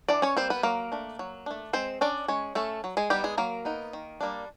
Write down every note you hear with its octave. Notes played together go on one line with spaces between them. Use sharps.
E3 D4 D5
C#4 C#5
G3 A#3 C4 C5
B3 B4
F#3 A#3 A#4
A3 D4
F#3
A3 D4
G#3 C4 C5
C#4 D4 D5
G#3 C#4 C#5
A3 C#4 A4
F#3
G#3 G#4
G3 B3 D#4 G4
G#3 G#4
F#3 A#3 A#4
B3 D#4
D#3
G3 A#3 D4